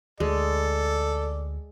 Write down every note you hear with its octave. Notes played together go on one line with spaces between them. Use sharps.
D2 G#3 A4 D5